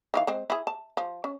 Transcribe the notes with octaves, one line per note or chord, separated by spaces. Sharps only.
D#3 E3 F5
G#3 C4 C5
E4 G#4
A5
F3
C#4